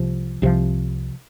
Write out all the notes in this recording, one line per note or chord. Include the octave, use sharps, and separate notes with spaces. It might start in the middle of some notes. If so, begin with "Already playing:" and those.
Already playing: C2 C3 F3
C2 C3 F3